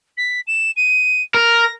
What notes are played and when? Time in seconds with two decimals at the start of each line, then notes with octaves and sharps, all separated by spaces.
0.17 B6
0.47 E7
0.76 D#7
1.34 A#4 A#6